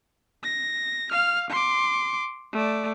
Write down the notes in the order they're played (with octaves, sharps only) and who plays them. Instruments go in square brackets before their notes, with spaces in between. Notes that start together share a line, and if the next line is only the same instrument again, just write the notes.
[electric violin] A#6
F5 F6
C6 D6
A3 D5